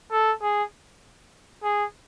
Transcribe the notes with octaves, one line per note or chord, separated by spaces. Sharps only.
A4
G#4
G#4